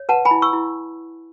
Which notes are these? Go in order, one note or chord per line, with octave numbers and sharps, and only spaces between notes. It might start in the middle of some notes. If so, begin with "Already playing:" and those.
Already playing: C#5
B4 F#5 A5
G#5 B5
E4
C#6 E6
E4